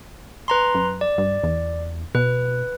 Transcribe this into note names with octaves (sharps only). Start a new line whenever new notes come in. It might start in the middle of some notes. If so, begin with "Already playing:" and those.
B4 A#5 C6
F#2
D5
G2
E2
B2 B4